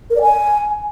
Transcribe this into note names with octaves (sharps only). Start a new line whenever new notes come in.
A#4
D5
G#5